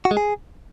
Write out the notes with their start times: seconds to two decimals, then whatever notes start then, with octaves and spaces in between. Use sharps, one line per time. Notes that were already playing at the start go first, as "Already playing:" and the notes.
0.05 F#4
0.11 G#3
0.17 G#4